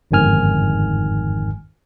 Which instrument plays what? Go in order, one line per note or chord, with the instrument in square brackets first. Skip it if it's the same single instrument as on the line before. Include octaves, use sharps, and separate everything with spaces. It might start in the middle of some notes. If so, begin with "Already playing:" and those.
[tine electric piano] G1 F2 G#2 D#3 G#5 F6